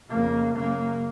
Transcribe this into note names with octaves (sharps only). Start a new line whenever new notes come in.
F2 C#3 A#3
F#2 C#3 A#3